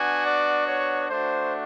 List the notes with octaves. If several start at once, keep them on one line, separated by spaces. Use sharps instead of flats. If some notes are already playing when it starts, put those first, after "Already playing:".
Already playing: B3 D4 F#4 G#5
D5
C#5
A3 D4 F#4 C5